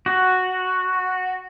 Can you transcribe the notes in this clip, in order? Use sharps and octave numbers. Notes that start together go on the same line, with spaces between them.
F#4